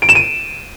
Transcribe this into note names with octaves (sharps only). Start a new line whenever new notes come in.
D7
E7
D#7